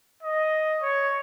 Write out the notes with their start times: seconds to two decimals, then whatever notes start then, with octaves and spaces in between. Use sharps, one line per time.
0.23 D#5
0.82 C#5